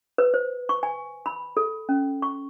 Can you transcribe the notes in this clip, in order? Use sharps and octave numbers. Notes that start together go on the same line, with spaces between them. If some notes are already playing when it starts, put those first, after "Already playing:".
B4
C5
C#6
G#5
B5
A4
C#4
C#6